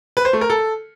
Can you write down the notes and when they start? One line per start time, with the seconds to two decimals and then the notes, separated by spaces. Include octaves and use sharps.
0.17 B4
0.25 C5
0.33 A3
0.41 A#4
0.50 A4